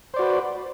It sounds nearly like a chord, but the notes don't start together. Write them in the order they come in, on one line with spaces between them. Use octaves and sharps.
C5 D5 F#4 B4